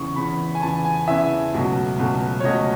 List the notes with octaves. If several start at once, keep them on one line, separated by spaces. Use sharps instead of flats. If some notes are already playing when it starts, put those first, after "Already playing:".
Already playing: E2 C#3 E3 C#6
E2 C#3 E3 B5
G#5
E2 C#3 E3 A5
G#5
E2 C#3 E3 E5
C#2 B2 F#3 A3
C#2 B2 F#3 A3
C#5
C#2 B2 F#3 A3 D#5